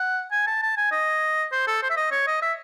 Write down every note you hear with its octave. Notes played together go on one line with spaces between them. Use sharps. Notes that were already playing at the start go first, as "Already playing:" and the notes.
Already playing: F#5
G#5
A5
A5
G#5
D#5
C5
A4
C5
E5
D#5
C#5
D#5
E5